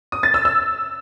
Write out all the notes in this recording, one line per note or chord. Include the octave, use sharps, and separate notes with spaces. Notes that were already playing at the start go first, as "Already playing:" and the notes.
D#6
A6
E6
E6